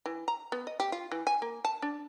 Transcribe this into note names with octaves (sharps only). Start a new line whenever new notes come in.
E3
A#5
B3
D#5
G4
F4
E3
G#5
A#3
A5
D4